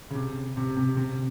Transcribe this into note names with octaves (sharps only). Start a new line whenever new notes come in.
C#3
C3
C3
C3
C3